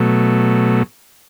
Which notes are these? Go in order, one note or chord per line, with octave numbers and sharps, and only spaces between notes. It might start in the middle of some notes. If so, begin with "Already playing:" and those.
Already playing: B2 F#3 A3